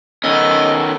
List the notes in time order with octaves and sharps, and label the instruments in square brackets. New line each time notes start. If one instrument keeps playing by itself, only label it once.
[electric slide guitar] D#3 B3 C#4 [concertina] A4 [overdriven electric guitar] D#5